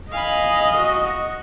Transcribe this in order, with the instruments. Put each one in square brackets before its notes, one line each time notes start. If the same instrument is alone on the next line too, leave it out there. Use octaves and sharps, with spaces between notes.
[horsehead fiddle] D#5 [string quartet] F5 G#5 B5
[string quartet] F#4